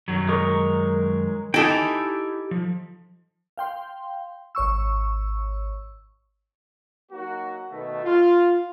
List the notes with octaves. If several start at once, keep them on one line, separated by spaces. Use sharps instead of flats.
F#2 D#3 F#3
G#3 A#4 C#6
D#4 E4 G4 A4 G5 G#5
F3
F5 G5 C6
G#1 C#5 C#6 E6
F#3 A#3 D#4 F#4
B2 D#3 A3
F4